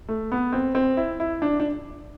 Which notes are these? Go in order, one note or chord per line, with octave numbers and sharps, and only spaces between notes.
A3
B3
C4
C4
E4
E4
D4
D4